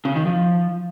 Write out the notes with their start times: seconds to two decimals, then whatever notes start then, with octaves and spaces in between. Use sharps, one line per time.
0.05 C#3
0.15 D#3
0.26 F3